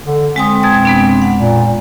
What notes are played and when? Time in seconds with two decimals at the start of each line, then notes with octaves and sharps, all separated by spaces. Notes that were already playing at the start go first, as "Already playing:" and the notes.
0.06 D3
0.36 G#3 C4 G#5 D#6
0.63 F2 B2 A6
0.85 G#3 B3 D4
1.22 F#5
1.38 A#2